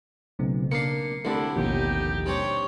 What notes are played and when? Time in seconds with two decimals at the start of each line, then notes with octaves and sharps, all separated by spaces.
0.39 B1 C#3 A3 C4
0.71 A#3 D4 C7 C#7
1.25 C2 D3 A3 D4 E4 G4 A#4
1.56 A1 D#2 B2 F3 D#4 G4
2.26 G3 C4 D4 C#5